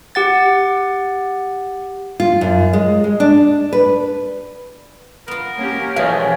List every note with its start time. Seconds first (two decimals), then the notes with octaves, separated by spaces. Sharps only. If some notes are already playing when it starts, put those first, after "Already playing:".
0.15 G4 F#5 A6
2.20 F4
2.41 F#2
2.73 G#3
3.04 G#3
3.20 D4
3.73 B4
5.28 B3 F4 A#4
5.57 A#3 C#4 G4
5.96 B2 E3 F3 G#3 C#5 E5 F5